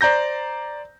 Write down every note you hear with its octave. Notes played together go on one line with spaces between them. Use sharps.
C5 D5 A#5 G6 A#6